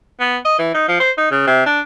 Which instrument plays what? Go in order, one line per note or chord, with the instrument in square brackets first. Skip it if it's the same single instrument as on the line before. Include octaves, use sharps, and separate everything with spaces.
[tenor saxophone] B3
D#5
E3
D#4
F3
C5
D#4
C#3
C3
D4